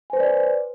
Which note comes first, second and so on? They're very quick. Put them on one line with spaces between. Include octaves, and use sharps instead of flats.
G#5 C5 B4 D5